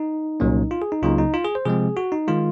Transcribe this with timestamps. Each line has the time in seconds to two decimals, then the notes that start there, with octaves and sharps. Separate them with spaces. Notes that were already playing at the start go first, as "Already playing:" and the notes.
Already playing: D#4
0.40 C2 A#2 F#3 A#3 C#4
0.71 F4
0.82 G#4
0.92 D#4
1.02 C#2 C#3 F#3 A#3 D#4 F4
1.18 D#4
1.34 F4
1.44 G#4
1.55 C5
1.65 C3 F3 G#3 C4 G#4
1.97 F#4
2.12 D#4
2.28 D#3 G#3 F4